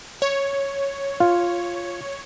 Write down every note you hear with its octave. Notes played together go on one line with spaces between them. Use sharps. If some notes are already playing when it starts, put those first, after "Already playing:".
C#5
F4